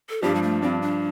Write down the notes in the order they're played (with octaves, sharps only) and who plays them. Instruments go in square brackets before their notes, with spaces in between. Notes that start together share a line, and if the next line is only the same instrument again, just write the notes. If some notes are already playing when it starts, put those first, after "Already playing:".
[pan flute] A4
[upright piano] G2 F3 D4 [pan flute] G4
[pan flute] G3
A3
[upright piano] G2 F3 D4 [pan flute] C4
[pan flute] D4